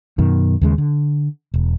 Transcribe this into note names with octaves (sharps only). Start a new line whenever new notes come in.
F#2 B2 D#3
D#2 C#3 G#3
D3
E1